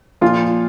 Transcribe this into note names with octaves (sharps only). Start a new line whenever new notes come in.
A#2 F3 F4